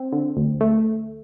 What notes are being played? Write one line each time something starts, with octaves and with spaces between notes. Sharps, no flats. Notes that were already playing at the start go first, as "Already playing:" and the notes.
Already playing: C4
D3
D2
A3